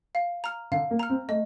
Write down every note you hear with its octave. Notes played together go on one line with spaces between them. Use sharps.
F5
A#5 F6
D3 F5
A#3
A#5 F6
C4
A3 D#5